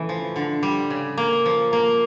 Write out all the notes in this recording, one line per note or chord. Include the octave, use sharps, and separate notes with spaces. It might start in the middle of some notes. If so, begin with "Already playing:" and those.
Already playing: C#3 E3 A3
F3
D3
G3
C#3
A#3
F3
A#3